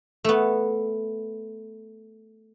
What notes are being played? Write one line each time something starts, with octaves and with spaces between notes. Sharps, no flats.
A3 B3